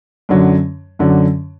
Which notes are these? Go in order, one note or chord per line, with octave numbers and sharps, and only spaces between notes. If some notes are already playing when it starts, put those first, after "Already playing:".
F#2 D3 F#3
F#2 D3 F#3